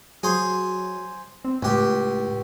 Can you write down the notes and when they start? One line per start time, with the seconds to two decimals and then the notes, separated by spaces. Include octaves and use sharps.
0.23 F#3 G#4 C5
1.45 C4
1.62 C#2 A2 G4